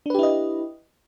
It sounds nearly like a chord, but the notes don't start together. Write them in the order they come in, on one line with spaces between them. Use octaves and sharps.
D4 B4 G4 E4 D#5